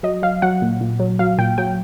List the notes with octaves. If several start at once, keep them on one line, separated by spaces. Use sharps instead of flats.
F#3 D#5
F#3 F5
F#3 F#5
A#2
A#2
F#3
F#3 F5
A#2 G5
F#3 G5